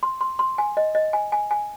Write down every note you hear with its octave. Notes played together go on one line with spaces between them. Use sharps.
C6
C6
C6
G#5
D#5
D#5
G#5
G#5
G#5